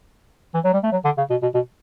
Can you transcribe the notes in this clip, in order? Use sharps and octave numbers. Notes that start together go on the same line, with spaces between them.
E3
F#3
G3
A3
F#3
D3
C#3
B2
B2
B2